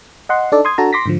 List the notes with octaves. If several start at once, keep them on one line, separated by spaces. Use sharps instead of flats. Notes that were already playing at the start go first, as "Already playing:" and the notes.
D#5 F#5 C6
D4 D#4 A4 D5
C6 D#6 G#6
D4 F#4 A4 A5 A#5
C6 D6 A#6 B6
G#2 D3 F3